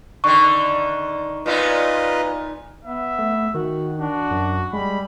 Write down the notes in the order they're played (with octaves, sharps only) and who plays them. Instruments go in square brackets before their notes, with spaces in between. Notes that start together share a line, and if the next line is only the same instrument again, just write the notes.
[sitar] D3 D#3 [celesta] C#6
[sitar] A#2 B3 D#4 [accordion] F4 B4 D#5
[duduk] B3 [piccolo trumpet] E5
[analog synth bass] A3
[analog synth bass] D#3 [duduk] F#4
[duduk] D4 [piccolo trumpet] F#4
[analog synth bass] F#2
[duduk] G3 [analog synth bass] G#3 [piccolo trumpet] B5